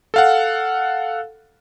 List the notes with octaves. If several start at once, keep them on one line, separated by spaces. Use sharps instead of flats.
A4 F5 F#5